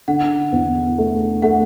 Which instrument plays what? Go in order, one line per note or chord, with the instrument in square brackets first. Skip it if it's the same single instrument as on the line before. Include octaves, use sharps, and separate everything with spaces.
[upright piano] D3 [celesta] F#5
[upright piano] E2
A3
[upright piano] A3 [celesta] F#5